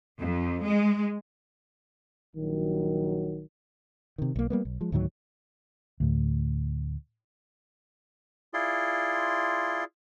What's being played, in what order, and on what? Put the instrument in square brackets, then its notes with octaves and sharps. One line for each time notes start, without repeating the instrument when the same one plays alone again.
[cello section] F2
G#3
[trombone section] A#1 D#3 F#3
[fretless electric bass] C3 D#3
B1 A#3
G3 A#3 B3
B1
F3 G#3
D2 A2 D#3 F#3
[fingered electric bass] D2 A2
[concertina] E4 F4 G#4 D5 C6